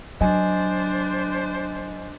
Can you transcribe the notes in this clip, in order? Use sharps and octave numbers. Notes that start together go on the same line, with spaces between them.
F#3 D4 C5 D#5 G#5